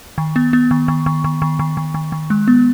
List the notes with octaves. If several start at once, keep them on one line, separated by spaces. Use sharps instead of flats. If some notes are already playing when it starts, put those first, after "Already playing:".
D#3
B3
B3
D#3
D#3
D#3
D#3
D#3
D#3
D#3
D#3
D#3
G#3
B3